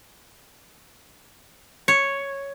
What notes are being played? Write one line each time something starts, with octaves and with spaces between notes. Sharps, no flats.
C#5